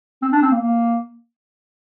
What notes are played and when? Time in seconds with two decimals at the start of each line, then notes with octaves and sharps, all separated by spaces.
0.22 C4
0.32 D4
0.42 C4
0.52 A#3
0.62 A#3